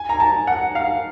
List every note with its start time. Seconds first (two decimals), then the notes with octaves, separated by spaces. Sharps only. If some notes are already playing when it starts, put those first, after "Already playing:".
Already playing: G#5
0.09 A#5
0.20 A5
0.47 F#5
0.75 F5